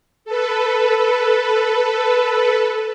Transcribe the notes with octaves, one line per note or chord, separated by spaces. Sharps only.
A4 B4